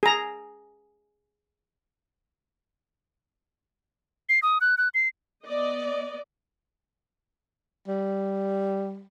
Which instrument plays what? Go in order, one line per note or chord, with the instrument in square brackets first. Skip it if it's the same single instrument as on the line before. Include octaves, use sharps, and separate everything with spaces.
[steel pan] G#4 A#5
[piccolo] C7
D#6
F#6
F#6
C7
[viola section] B3 D5 D#5
[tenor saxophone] G3